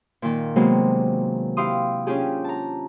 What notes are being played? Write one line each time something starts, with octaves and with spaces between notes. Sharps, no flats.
A#2 D#3
C3 F#3 G#3 A#3 B3
E4 G4 F5 C6 D#6
C#4 D4 F4 G4 G#4
A5 A#5